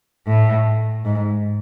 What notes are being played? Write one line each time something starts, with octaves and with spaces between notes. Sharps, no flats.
A2
G#2